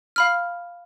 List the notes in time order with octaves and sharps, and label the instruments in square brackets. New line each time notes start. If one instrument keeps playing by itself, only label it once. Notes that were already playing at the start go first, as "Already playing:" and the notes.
[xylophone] F5 B5 F6